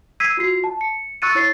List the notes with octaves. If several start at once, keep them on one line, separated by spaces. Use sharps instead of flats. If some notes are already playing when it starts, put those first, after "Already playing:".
E6 G#6 B6 C7 D#7
F4 F#4 C7
A5
C#7
C#6 E6 F#6 A6 C#7 D#7
E4 C#5 A6 C7